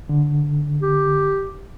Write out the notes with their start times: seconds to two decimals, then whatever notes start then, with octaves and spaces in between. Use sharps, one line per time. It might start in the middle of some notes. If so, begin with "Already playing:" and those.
0.09 D3
0.82 G4